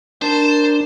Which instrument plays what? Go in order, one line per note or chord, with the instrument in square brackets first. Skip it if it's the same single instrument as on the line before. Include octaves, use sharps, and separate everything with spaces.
[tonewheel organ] D4 [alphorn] A#4 [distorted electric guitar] C5 [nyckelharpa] A5